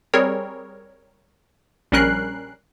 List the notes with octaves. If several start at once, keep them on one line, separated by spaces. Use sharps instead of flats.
G3 C4 G#4 A#4 C#5
A#1 G3 C#4 A#4 F#6 C7